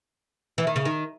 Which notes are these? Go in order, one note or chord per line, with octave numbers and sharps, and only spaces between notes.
E3
D#3
C#3
D#3